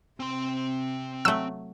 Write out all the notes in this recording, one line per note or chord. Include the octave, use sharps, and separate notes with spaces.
C3 C4 C6
F#3 A3 E6